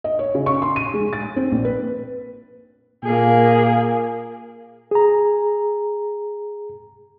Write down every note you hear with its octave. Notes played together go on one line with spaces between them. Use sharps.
D#5
C#5
C#3
C#6
C6
D#7
G#3
A6
C4
A#1
B4
A#2 A#3 G#4
G#4 A#5